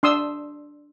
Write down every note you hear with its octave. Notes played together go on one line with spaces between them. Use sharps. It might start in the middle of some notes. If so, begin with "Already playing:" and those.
D4 C6 D#6 E6